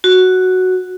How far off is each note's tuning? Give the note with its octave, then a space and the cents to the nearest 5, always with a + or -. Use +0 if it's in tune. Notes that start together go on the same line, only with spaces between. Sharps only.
F#4 +0